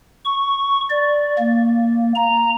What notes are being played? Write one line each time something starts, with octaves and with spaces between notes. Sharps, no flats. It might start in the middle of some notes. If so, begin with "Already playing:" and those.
C#6
D5
A#3
A#5